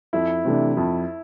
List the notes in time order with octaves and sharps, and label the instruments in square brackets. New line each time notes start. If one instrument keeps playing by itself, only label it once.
[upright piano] F2 [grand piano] E4
[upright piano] C3 E3 A3 D4
F2